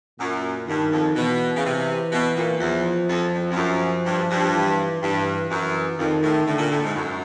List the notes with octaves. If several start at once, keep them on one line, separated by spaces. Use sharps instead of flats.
F#2 A#2
G2 D#3
F2
B2 E3
C#3
C3
B2
A#2
E2 F3
F2
F2
F2
F#2 F3
G2
G2
E3
G2 E3
F#2 E3
F2 D#3
A2
A2 D3
A#2
A2
G#2
F#2